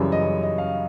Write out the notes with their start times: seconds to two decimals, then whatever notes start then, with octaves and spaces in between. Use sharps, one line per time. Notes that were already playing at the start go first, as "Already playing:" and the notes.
Already playing: F#2 C#3 E3 G3 C#5
0.12 D#5
0.43 D#5
0.58 F5